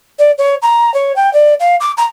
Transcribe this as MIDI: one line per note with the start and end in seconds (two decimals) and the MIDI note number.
0.19 0.31 74
0.38 0.55 73
0.62 0.93 82
0.94 1.15 73
1.16 1.32 79
1.34 1.54 74
1.60 1.76 77
1.80 1.92 86
1.97 2.05 82